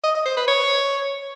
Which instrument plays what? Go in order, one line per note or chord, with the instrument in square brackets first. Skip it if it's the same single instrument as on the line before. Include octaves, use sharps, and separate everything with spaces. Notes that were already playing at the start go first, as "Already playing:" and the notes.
[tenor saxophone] D#5
D#5
C5
B4
C#5